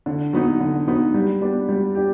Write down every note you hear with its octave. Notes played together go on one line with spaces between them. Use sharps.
D3
F#3 B3 D#4
D3
F#3 B3 D#4
G3
B3 D4 G4
G3
D4 G4